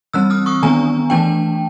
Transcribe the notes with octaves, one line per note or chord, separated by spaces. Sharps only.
E3 G3 C4 E6 F#6
D#6 F6
C#6 D#6
D#3 G#3 B3 D4 G#5 A#5
E3 A3 D4 G5 A5